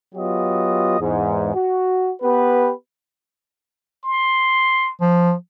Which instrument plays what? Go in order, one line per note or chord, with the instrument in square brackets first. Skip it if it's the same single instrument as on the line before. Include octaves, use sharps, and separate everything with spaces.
[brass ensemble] F#3 B3 F4 G4 D#5
E2 G#2
F#4
B3 G4 B4
[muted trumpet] C6
[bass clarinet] F3